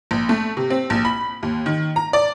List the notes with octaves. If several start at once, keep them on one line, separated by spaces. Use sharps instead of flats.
A#1
A3
C3
C4
A#1
B5
D#2
D#3
A#5
D5